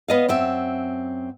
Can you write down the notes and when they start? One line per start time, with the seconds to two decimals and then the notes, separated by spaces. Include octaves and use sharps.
0.08 B3 D#5 F5
0.29 F#2 C4 E5